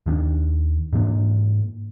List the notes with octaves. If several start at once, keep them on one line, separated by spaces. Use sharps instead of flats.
D#2 D#3 C#4 D4
G#2 E3 A#3 D4